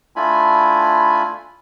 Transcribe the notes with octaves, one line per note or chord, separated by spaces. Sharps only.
A3 D4 E4 F4 G#5 B5